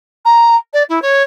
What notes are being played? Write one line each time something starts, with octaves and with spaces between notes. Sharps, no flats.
A#5
D5
E4
C#5